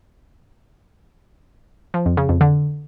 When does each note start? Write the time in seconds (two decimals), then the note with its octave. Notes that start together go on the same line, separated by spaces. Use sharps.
1.94 F3
2.06 F2
2.17 C#3
2.29 F2
2.41 D3